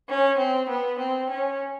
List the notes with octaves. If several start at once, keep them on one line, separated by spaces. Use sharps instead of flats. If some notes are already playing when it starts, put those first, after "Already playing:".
C#4
C4
B3
C4
C#4